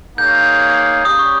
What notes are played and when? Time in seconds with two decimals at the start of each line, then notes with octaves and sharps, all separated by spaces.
0.18 A#3 D#4 G#4 C#5 F5 G6
1.05 G3 C#4 G4 D#6
1.19 C#6